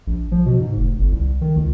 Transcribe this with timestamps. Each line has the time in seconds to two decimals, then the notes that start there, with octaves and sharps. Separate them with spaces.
0.07 A#1
0.32 F3
0.46 B2
0.61 G#2
0.77 F1
0.98 G1
1.12 C2
1.41 D#3
1.56 C#2